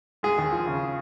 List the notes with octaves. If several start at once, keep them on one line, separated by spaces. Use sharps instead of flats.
G#3 G#4
D#2
F3
C#3